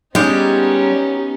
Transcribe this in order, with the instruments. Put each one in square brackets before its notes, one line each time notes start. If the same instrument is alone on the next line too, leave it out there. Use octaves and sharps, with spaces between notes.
[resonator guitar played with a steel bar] G3 G#3 [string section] B3 C#4 D#4 [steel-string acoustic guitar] G4